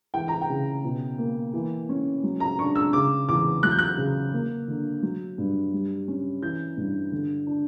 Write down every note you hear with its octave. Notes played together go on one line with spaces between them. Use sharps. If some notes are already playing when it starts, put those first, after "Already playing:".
E3 G5
A#5
G5
C#3
B2
A#3
E3
C#4
F#3
A#5
D4 C#6
E6
C#3 D6
E2 D6
F#3 F#6
G6
F#6
C#3
A#3
D3
F#3
G2
G3
C#4
E3 G6
G2
D3
D4